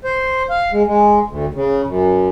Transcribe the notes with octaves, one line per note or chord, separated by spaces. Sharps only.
C5
F5
G#3
G#3
D2
C#3
F#2